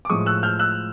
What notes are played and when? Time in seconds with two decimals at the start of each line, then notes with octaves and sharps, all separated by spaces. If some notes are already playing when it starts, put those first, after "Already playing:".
0.05 D6
0.09 A2 F3 G#3 C#6 D#6
0.26 E6 F#6
0.43 F6 G6
0.59 E6 F#6